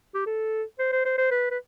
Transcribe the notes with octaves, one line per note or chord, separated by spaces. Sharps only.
G4
A4
C5
C5
C5
C5
B4
B4